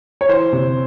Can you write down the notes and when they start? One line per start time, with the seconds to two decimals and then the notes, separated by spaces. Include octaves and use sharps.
0.21 C#5
0.29 E3 C5
0.53 C3